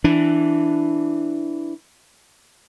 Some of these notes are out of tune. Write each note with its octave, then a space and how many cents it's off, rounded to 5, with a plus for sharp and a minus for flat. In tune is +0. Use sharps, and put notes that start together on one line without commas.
E3 +0 D4 +0